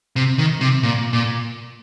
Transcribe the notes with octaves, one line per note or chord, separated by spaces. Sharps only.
C3
D#3
C3
A#2
A#2